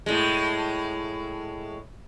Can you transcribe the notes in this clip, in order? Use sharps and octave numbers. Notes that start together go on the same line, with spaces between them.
A2 G#3